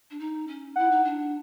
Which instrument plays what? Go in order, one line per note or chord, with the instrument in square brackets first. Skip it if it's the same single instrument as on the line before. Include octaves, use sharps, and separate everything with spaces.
[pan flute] D4
D#4
C#4
[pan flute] E4 [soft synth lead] F#5
[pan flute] D#4
D4